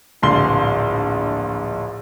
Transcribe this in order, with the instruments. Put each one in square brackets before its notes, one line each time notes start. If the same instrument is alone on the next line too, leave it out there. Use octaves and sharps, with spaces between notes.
[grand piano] D1 A#1 C6 G7